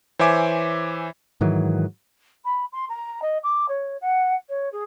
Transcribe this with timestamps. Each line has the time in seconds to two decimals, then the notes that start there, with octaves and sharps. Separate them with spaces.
0.19 E3 C5 C#5 E5 G#5 D6
1.41 G#2 D#3 E3 F#3
2.44 B5
2.72 C6
2.89 A#5
3.22 D#5
3.43 D6
3.68 C#5
4.00 F#5
4.49 C#5
4.72 G#4